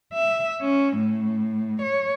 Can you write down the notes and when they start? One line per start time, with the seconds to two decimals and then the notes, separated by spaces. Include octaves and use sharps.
0.14 E5
0.61 C#4
0.97 A2
1.82 C#5